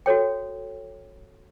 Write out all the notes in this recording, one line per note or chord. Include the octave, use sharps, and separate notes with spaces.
F#4 A4 C#5 G5